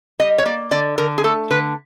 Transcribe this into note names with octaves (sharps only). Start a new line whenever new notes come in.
G3 D#5
C#5
A#3 D5
D3 D5
D3 A#4
G#4
A3 A4
D3 B4